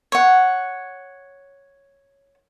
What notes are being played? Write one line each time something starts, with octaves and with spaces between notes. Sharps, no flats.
C#5 F#5